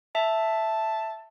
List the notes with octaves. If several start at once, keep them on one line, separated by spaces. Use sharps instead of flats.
E5 A5